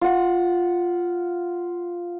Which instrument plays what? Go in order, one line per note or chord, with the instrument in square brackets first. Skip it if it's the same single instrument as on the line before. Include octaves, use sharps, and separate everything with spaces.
[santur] F4 F#5